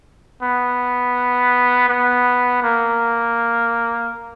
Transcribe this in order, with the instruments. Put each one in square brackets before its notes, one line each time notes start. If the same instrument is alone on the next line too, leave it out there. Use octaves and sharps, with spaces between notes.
[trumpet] B3
B3
A#3